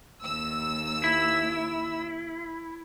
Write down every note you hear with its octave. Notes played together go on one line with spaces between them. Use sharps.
D#2 E6
E4